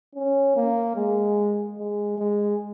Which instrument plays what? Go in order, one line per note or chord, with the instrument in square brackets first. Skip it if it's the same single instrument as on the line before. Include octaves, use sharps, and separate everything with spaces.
[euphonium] C#4
A#3
G#3
G#3
G#3